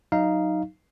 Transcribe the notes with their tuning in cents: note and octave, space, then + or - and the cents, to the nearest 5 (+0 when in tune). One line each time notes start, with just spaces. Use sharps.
F#3 +0 D#4 +0 F5 -10